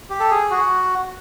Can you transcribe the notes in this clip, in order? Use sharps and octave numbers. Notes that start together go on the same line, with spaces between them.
G4
A4
G#4
F#4